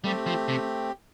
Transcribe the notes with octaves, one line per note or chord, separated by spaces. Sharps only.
G3 A3 C4 G4
F3
C3